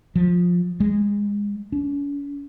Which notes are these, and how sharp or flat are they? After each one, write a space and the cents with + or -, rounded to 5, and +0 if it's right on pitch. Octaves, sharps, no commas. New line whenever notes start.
F3 +15
G#3 -25
C#4 +45